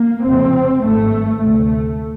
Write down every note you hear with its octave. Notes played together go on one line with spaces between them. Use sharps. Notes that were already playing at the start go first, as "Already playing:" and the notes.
Already playing: A#3
F1 F2 C#3 C4
G#1 G2 A3
D2 C3 A3